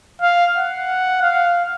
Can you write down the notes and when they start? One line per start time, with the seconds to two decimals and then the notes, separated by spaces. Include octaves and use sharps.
0.22 F5
0.58 F#5
1.22 F5